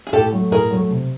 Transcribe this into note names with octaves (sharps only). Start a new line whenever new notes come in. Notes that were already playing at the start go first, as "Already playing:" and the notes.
G#4
A2 G4 A4
F#3 A3
A2 G#4 A#4
F#3 A3
C3